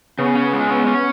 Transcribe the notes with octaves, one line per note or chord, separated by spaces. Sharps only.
C#3 B3
C#4
G#3
C#4
C#4